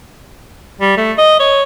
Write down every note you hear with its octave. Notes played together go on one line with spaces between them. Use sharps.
G3
A3
D#5
C#5